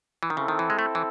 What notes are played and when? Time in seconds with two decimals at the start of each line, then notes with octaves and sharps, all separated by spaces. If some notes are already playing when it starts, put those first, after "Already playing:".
0.23 E3
0.30 D#3
0.37 C#3 C4 E4 A4
0.48 D#3
0.59 E3
0.70 G#3
0.79 A3
0.95 E3